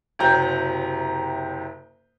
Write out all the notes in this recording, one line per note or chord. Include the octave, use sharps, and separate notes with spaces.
F#1 C3 F#3 G4 A#5 G6